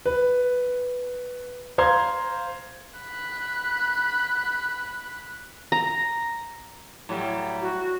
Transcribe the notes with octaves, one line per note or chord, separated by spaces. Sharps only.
B4
C5 F5 A#5 C6 G#6
B5 F#6
A#5
A2 F#3 G3
F#4